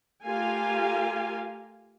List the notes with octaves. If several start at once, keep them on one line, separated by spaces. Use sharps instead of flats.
A3 F4 G4 A#4 F5 G#5